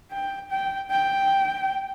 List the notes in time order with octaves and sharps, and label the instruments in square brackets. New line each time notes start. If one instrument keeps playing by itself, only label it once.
[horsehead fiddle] G5
G5
G5